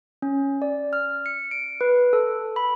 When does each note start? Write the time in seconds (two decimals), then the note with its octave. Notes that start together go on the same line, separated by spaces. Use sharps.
0.22 C#4
0.62 D5
0.93 F6
1.26 C#7
1.51 D7
1.81 B4
2.13 A4
2.56 B5